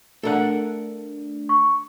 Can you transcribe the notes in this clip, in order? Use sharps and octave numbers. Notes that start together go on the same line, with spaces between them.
A3 D4 A4 A#4 F#5
C#6